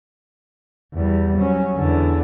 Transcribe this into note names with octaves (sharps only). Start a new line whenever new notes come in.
E2 G3
F#3 C#4
E2 D3